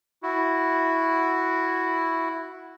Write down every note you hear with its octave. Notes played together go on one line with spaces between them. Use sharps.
E4 F#4